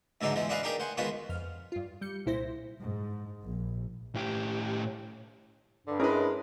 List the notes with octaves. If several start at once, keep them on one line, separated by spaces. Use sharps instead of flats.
G#2 D3 E3 F#3 D4 D#4
E2 E3 F3 G#3
D4 F#4 G#4 B4 D#5 F5
D4 D#4 G4 G#4 A#4
C5 F#5 G#5
D#3 G#3 B3 F4 F#4 B4
F2 F6
G2 F4
G3 G6 C#7
C2 A#2 E4 C5 A#6
G#2
A#1
A2 G4
G2 D3
G#3 C#4 E4 A#4 B4